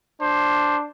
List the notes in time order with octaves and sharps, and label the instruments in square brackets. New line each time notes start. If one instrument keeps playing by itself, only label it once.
[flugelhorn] D4 [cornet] C5